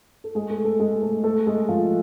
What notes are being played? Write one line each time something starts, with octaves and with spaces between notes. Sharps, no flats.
A4
G#3 G#4
A3 A4
A3 A4
G#3 G#4
A3 A4
A3 A4
G#3 G#4
F3 F4